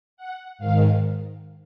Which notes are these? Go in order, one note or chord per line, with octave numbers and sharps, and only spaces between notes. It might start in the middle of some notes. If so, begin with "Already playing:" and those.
F#5
G#2 D#3 F5